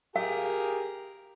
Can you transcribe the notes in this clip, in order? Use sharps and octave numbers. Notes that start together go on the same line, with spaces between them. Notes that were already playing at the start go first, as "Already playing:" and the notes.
G4 G#4 A#4 F5